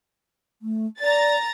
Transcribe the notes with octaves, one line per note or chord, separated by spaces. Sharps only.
A3
D5 A#5 A6